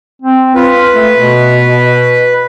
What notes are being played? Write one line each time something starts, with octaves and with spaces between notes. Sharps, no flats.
C4
F4 B4
A3
B2